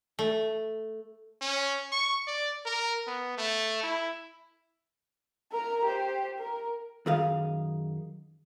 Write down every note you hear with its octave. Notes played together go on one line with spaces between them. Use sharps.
A3
C#4
C#6
D5
A#4
B3
A3
E4
A#4 A#5
G4 C5
A#4
F#2 D#3 G#4 F5